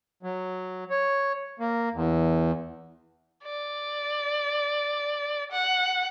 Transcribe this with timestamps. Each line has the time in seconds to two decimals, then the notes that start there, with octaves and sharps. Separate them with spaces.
0.23 F#3
0.90 C#5
1.60 A#3
1.94 E2
3.44 D5
5.52 F#5